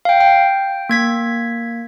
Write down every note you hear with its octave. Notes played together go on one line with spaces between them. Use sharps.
F5 G5
G5
A#3 G#6 B6